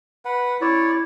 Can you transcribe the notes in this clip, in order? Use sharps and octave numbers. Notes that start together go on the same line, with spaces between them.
B4 F#5
E4 C#5 D5